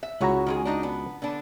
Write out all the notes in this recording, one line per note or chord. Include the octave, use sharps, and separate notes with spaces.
E5
C#2 E4 F#4 G#4 C#5 A#5
D#3 G#3 G#4
D4 D#4 D#5
B3
D3 B3 D4